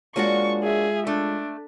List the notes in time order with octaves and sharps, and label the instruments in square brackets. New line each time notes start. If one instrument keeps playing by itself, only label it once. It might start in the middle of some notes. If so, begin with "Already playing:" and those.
[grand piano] G#3 F4 C#5 [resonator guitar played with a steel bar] A#3 D4 F#4 [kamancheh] C#6
[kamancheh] G#4 E5
[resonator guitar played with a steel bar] A3 [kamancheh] D4